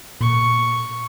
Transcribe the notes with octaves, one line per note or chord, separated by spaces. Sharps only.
A#2 C#6